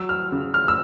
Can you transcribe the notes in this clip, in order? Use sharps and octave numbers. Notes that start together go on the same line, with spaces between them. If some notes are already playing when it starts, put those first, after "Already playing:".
Already playing: F#3 E6
F6
C#3
F6
E6